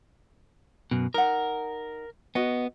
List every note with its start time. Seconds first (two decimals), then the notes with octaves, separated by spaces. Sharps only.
0.91 F#2 B2
1.14 D#4 A#4 F#5
2.35 B3 F#4 D#5